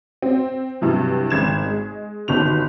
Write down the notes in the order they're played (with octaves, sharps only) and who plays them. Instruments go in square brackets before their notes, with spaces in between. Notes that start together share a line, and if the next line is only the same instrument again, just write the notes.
[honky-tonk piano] C4
G2 C3 E3 F#3
G#1 G#6 E7
G#3
G1 B2 D#3 F7